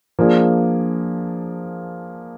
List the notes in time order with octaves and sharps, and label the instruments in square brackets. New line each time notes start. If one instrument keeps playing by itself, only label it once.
[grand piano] F3 A#3 D4 G#4